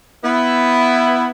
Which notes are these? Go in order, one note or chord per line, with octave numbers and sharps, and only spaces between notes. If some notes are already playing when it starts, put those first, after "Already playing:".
B3 E4